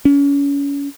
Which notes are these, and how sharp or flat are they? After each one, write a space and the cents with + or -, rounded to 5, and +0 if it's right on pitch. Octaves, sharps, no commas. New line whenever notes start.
C#4 +30